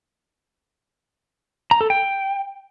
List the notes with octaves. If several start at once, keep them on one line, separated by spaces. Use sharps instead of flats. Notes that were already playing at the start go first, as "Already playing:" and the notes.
A#5
A4
G5